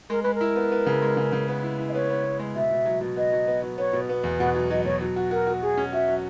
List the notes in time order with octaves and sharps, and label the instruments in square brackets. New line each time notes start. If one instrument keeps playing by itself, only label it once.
[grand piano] G#3 [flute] A#4
[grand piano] G#3 [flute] B4
[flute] A#4
[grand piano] E4
B3
B3
C#3
G#3
C#3
C#3
B3
E4
E4
[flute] D#5
[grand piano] B3 [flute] C#5
[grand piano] B3
B3
G#3
[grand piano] B2 [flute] E5
[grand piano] B2
F#3
B2
[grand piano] B3 [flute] D#5
[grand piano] F#3
B3
F#3
[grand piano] B3 [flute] C#5
[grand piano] B2
B3
E2
[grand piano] B2 [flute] F#5
[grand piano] F#3
[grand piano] F#3 [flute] D#5
[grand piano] B2 [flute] C#5
[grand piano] F#3
F#4
[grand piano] F#4 [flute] A#4
[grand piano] F#4
[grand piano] F#3 [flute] G#4
[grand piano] C#4
[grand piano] F#4 [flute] E5
[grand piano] F#3